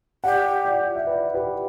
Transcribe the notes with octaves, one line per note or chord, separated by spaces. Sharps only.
G4 D5 F#5
D5 F#5
E5
B4 D5
G4 B4